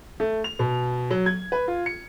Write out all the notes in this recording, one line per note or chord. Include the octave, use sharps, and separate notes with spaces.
A3
F7
B2
F#3
G#6
B4
F4
C#7